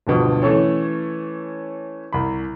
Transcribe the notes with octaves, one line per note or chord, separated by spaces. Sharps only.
D1 G2 B2 F3
E3 A3 C#4 A4 C#5
C2 B5